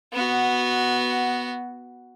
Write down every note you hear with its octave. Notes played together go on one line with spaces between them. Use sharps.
B3 F#4